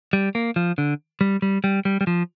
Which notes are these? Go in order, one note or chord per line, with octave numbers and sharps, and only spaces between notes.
G3
A#3
F3
D3
G3
G3
G3
G3
G3
F3